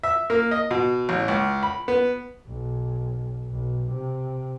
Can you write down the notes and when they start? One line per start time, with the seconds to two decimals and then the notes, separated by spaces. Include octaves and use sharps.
0.03 E5
0.30 A#3
0.51 D#5
0.71 B2
1.09 A1
1.28 C#2
1.63 B5
1.88 B3
2.48 B1
3.50 B1
3.91 C3